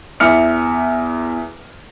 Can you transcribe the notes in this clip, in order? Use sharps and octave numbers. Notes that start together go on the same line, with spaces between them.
E2 E5 F6 C#7